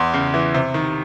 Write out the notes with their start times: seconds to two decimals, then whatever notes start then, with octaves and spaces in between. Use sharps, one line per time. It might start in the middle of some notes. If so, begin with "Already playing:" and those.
Already playing: E2 C6
0.14 C#3
0.34 E3
0.54 C3
0.74 D#3